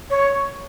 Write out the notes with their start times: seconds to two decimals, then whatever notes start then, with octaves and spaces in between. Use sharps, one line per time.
0.10 C#5